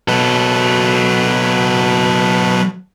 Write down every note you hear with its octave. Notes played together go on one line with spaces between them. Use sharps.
B2 F#3 A4 B4